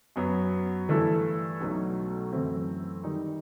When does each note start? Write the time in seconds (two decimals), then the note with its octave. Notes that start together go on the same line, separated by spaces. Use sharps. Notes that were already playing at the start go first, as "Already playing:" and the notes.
0.16 F#2 F#3 B3
0.89 G2 E3 A3 E4 A4
1.60 B1 B2 F#3 A3 D#4
2.32 F#2 E3 A3 C4 E4
3.04 D#3 G3 D#4